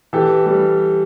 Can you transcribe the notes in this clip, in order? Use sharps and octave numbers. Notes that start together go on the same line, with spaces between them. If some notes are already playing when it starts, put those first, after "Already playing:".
E3 G4 A4
G3